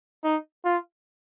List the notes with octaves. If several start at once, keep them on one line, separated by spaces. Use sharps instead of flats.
D#4
F4